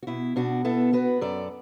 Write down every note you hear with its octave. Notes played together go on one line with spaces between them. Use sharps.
F#4
B2 E4
B2 D4 F#4
B3 E4 A4
B3 F#4 B4
F#2 A4 D5